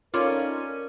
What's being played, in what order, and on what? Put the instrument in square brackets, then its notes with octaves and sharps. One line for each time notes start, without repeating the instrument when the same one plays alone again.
[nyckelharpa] C#4 [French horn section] D#4 A4 A#4 [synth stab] F4 [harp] C#5 D5